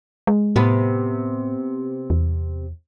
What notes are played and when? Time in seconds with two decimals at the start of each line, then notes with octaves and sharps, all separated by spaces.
0.27 G#3
0.56 A2 C3 B3
2.10 E2